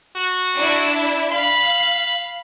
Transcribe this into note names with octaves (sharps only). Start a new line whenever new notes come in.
F#4
D4 E4
F5 B5